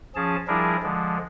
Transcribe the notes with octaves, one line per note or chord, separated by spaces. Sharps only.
F3 C#4 G#4 A5
F3 G3 D4 E4 G#4 A#4
D3 F3 G#3